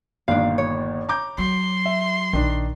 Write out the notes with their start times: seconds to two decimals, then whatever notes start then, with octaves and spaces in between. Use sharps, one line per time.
0.28 G1 A#2 D#3 D4 F5
0.58 C#5
1.09 A#5 D6 G6
1.38 F#3 C6
1.86 E5
2.33 A#1 D#3 D4